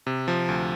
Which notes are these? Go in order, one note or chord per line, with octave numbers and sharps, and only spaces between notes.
C3
F3
D2